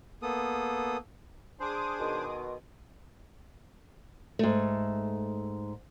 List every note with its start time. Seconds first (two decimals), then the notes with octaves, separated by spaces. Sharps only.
0.22 A#3 B3 A4 D#6
1.60 D4 G#4 C5 C6 D6 D#6
1.99 B2 D#3
4.39 G#2 A3